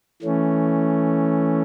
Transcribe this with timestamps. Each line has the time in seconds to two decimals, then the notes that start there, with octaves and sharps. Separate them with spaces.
0.22 E3 A3 C#4